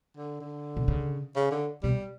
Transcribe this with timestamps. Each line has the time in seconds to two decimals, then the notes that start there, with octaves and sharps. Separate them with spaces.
0.17 D3
0.40 D3
0.77 B2
0.88 C#3
1.36 C#3
1.51 D3
1.83 B2 G3